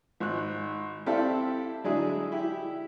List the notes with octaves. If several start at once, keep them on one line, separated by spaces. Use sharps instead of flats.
G#1 F#6
C4 E4 G4 A4 D5 F5
D3 F#3 G#3 D4 E4 G#4
E4 G4